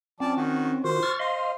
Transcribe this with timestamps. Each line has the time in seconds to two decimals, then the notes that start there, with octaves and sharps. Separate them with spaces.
0.20 F3 C4 C#4 D5 A5
0.37 D#3 F#4
0.84 D#3 F4 F#4 C5
1.03 C#6 F6 A6
1.19 C5 D#5 F5 C6